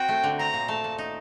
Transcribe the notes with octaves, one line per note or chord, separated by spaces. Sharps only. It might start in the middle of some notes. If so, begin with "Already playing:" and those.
Already playing: C4 F#4 G5
A3
D3
C4 A#5
A#2
A3 A5
A#2
D#4